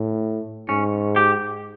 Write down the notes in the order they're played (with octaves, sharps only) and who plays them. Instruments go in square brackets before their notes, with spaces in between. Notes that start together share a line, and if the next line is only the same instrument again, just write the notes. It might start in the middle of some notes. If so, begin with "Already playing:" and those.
Already playing: [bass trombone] A2
[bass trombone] G#2 [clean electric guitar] C#4
[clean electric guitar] G4